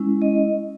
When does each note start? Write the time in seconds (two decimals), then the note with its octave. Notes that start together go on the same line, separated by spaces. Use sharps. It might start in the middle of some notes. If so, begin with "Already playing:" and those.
Already playing: G#3 C#4 E4
0.22 D#5